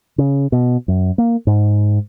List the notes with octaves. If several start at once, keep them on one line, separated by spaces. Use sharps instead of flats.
C#3
B2
F#2
A#3
G#2